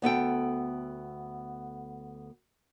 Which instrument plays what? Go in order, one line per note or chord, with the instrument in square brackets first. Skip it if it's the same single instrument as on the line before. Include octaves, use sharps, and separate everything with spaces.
[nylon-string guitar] D2 B3 A4 G5